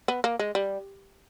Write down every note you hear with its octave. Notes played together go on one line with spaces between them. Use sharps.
B3
A#3
G#3
G3